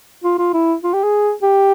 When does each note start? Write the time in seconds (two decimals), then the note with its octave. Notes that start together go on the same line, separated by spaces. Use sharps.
0.24 F4
0.38 F4
0.53 E4
0.83 F4
0.93 G4
1.03 G#4
1.43 G4